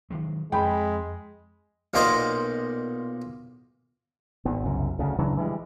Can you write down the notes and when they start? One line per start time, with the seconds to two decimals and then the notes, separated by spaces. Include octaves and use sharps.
0.10 D#3 F#3 G#3
0.52 F2 G#3 G5 B5
1.94 B1 A#2 A#3 A#4 C5 D#5
4.45 G#1 B3
4.64 C2 F#2 C#3
4.99 D2 C#3
5.19 C#3 E3 F#3 D4
5.37 E3 F3 G3 G#3